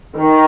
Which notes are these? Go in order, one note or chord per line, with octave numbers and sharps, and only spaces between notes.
D#3